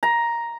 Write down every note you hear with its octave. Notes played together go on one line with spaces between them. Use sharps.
A#5